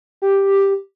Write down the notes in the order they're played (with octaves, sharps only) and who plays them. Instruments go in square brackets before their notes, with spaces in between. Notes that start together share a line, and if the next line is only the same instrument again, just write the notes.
[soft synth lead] G4